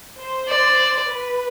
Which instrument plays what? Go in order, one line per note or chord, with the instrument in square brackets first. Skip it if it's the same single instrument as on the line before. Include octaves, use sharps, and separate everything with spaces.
[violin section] C5
[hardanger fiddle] D5
[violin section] B4